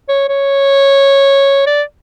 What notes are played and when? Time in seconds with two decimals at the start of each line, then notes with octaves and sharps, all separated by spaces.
0.09 C#5
0.29 C#5
1.67 D5